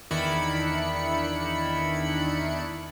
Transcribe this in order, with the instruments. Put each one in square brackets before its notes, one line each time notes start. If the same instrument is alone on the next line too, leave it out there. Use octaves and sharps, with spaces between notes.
[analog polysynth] E2 D#3 D4 E4 B5 C#7